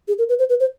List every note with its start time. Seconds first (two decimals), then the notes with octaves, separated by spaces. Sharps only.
0.08 G#4
0.19 A#4
0.29 B4
0.39 C5
0.49 B4
0.60 C5